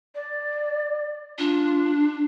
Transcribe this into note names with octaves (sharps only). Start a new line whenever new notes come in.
D5
D4 F4